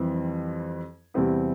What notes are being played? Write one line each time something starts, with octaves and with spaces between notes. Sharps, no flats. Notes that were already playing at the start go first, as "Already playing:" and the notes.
Already playing: F2 E3 G3 C4
E2 C3 G3 C4 E4